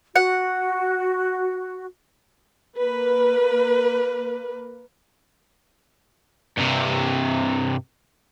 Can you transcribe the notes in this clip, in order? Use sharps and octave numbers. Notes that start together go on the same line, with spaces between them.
F#4 F#5
A#3 A#4 B4
G2 C3